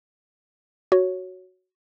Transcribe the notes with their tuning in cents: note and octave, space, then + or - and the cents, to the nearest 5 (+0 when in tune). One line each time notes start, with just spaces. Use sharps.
F#4 +0 C#5 +0